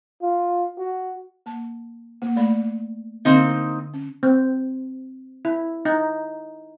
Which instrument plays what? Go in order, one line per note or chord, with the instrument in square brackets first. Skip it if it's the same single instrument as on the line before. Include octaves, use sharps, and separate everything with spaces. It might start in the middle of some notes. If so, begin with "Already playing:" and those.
[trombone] F4
F#4
[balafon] A#3 A5
A#3
A3 D5 B5
[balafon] D3 D4 [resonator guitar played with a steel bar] A#3 C4 D#4
[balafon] C#4
[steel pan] C4
E4
D#4